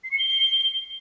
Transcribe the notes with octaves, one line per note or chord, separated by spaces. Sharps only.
C7
C#7
G7